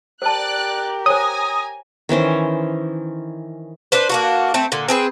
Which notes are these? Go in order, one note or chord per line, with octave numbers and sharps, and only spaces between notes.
G4 A#4 C5 D5 A5 F#6
C5 C#5 G#5 A#5 D#6 A#6
D#3 E3 C#4 C5
D4 B4 C5
A#3 D4 F#4
A3 C4
A#2 D3
C4 G#4 B4